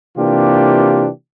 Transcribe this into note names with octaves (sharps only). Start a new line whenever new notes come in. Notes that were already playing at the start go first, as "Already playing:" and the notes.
C3 E3 A#3 D4 F4 G4